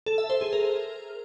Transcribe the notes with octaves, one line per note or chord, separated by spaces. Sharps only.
A4
E5
C5
G#4
A#4